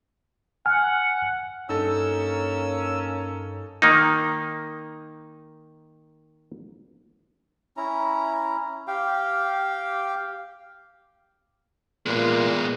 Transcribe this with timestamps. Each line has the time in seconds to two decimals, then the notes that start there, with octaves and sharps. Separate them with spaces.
0.66 F#5 G#5 F6
1.69 G2 A#3 C#4 D#4 A4 E6
3.82 D#3 A#3 D#4
7.77 C#4 E4 A#5
8.88 G4 F5 G5
12.06 A#2 G#3 B3